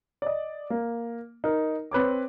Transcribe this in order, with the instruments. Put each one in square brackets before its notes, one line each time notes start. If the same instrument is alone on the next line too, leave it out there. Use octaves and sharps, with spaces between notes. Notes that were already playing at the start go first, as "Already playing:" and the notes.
[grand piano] D5 D#5
A#3
D#4 A#4
C4 B4 C#5 D6